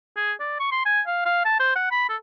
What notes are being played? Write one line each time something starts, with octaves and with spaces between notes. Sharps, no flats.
G#4
D5
C#6
C6
G#5
F5
F5
A5
C5
F#5
B5
A4